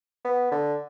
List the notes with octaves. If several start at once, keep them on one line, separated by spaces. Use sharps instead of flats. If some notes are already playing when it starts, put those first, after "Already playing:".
B3
D3